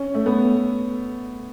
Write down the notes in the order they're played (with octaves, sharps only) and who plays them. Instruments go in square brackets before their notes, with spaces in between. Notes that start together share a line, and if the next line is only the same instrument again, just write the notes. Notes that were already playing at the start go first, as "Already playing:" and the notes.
Already playing: [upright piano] C#4
A3
B3